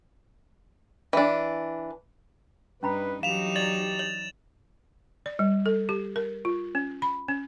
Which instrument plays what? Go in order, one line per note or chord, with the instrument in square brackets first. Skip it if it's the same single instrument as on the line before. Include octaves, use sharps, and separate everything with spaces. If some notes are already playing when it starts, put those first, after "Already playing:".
[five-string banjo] E3 D4
[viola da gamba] G2 D#4 [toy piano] C#4 A#5 B5 [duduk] B4
[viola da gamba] E3 F#3 D#4 [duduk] G4 [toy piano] F5 [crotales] E7 F7
[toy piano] D5 [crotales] A6 F#7
[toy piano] C#5 [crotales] F#7
[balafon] D5
G3
A4
G4
A#4
F4
C#4
B5
C#4